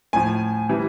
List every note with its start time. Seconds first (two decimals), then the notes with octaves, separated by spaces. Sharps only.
0.13 A2 F3 G#5
0.69 E3 G3